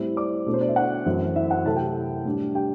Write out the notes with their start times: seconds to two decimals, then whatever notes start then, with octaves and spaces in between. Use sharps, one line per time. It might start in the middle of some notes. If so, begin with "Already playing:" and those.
Already playing: A2 G3 C4 E4
0.17 D5 D6
0.46 B2 A3 D4
0.54 C5
0.61 D5
0.69 E5
0.76 F#4 F#5
1.06 F#2 E3 A3 C4 E4
1.36 E4 E5
1.51 F#4 F#5
1.65 C3 F#3 A3 E4 A4 A5
1.76 G4 G5
2.25 A2 G3 D4
2.55 G4 G5